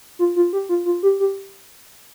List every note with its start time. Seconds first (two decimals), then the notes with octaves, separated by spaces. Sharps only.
0.19 F4
0.36 F4
0.53 G4
0.69 F4
0.86 F4
1.03 G4
1.20 G4